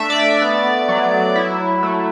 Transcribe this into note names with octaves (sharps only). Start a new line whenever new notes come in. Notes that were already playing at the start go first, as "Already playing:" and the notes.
Already playing: A3 D4 E5
D5
B3
F#3
E4
A3